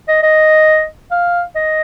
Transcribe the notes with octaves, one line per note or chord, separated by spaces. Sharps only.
D#5
D#5
F5
D#5